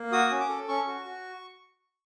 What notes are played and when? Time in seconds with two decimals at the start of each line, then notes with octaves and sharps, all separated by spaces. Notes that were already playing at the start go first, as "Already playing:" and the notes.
Already playing: A#3
0.12 F#4 D#6
0.31 C#4
0.40 D6
0.49 A4
0.68 C#4 C#6
0.87 F#4
1.05 F#4